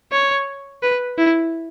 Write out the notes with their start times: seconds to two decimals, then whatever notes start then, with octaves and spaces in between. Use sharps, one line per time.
0.12 C#5
0.82 B4
1.18 E4